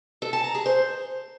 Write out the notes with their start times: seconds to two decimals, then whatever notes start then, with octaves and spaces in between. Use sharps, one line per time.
0.22 A4
0.33 A5
0.44 A#5
0.55 G#4
0.66 C5